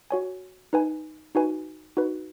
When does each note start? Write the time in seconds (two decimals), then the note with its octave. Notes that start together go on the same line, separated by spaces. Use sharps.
0.10 F#4 C#5 G#5
0.73 D#4 B4 G#5
1.35 D#4 F#4 B4 G#5
1.97 D#4 F#4 B4